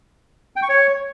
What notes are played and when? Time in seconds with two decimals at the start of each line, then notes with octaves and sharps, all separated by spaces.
0.56 G5
0.63 C#6
0.69 C#5